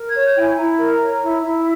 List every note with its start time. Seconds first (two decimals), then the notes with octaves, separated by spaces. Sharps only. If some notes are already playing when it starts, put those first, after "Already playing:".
Already playing: A#4
0.09 G#6
0.14 C#5
0.25 G6
0.36 E4 G5
0.42 G#5
0.58 E4 A#5
0.79 A#4
1.01 C#5
1.22 E4
1.43 E4